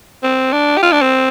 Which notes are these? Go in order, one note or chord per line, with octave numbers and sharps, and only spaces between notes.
C4
D4
G4
F4
D4
C4